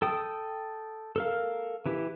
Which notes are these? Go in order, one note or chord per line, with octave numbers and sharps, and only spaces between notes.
A4 G5 D#6
A4 A#4 F5
E3 E4 G4